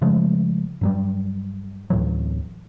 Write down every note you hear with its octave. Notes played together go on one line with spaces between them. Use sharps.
C#3 F3 G#3 A3
G2 F#3 G3
D2 A2 E3 F#3